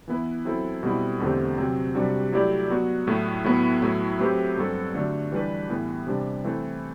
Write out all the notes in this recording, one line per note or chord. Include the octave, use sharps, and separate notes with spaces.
E3 B3 E4 B4
F#3 C4 E4 A4
B2 G3 C4 E4
E2 D3 A3 C4 G4
C3 F#3 C4
C3 G3 D4 F#4
F#3 A3 E4 G4 D5
F#3 B3 F#4
A2 F#3 A3 E4
A2 F#3 B3 E4 B4
A2 F#3 A3 E4
F#3 A3 C4 G4 B4
G2 F#3 C4 F#4 A4
D3 A3 D4 F#4
E3 G3 D4 G4 B4
A2 E3 B3
C3 G3 D4
E3 A3 C4 E4 A4